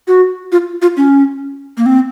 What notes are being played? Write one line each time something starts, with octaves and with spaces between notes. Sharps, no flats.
F#4
F4
F4
C#4
A#3
C4